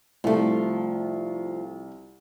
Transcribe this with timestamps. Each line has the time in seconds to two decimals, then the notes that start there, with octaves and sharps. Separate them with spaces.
0.24 C2 F3 A3